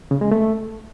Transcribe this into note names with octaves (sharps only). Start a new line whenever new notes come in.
C#3
G#3
A3